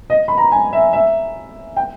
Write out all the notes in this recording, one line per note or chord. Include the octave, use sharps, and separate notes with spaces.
D#5
B5
A#5
G#5
E5
E5
G5